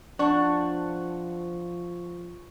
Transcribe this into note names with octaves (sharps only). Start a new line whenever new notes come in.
F3 D4 C5 F#5 A5 C#6